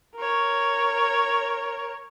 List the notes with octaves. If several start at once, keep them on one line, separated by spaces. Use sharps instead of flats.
A#4 C#5